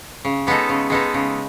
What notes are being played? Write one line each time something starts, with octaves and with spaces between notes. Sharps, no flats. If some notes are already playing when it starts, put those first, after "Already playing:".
C#3
G#3 B3 D#4 A4
C#3
G#3 B3 D#4 A4
C#3